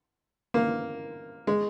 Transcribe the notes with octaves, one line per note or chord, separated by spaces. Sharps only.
A#3
G#3